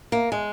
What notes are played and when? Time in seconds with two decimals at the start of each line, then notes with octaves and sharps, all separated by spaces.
0.12 A#3
0.32 G#3